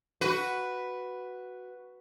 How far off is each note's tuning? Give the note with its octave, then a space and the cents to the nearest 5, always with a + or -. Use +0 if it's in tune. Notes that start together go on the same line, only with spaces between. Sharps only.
F#4 +0 B4 +0